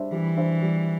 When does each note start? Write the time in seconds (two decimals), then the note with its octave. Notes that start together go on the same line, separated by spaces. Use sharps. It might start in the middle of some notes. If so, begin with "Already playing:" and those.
Already playing: G3 D4 C5 E5
0.12 E3 G3
0.37 D4 C5 E5
0.62 G3